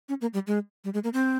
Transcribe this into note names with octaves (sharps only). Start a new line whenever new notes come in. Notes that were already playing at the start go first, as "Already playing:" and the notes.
C#4
A#3
G3
G#3
G3
G#3
A#3
C4